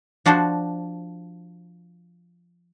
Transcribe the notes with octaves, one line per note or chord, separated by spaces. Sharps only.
F3 D4 F#4 C5